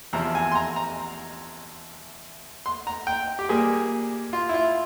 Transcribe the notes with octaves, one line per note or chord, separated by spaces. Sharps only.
E2 C3 F3 C4 A#5
G#5
C6
A#5
A#5
C6
A#5
G5
G4
A#2 G3 A#3 G#4
F4
E4
F4